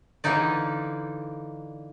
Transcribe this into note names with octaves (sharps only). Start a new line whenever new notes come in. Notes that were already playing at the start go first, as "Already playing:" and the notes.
D3 E3 A#3 D#4 D5